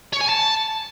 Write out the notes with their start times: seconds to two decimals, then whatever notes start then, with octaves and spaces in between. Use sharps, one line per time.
0.13 C#5
0.21 G#5
0.29 A5